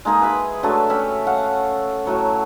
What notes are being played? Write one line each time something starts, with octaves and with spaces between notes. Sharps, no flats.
G#3 A#3 D#4 G#4
B4 E5 B5
F#3 A3 D4 A4
C#4 G4 E5 B5
C#5 F5 F#5
A2 F#3 C#5